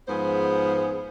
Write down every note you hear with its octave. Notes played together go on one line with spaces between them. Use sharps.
G#2 F3 B3 G#4 C5